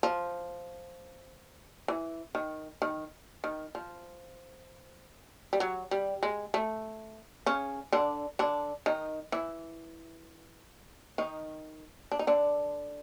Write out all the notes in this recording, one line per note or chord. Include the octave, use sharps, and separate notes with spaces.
F3
E3
D#3
D#3
D#3
F3
G3
F#3
G3
G#3
A3
C#3 C#4
D3 D4
D3 D4
D#3 D#4
E3 E4
D#3 D#4
D4
D#4
D3 D4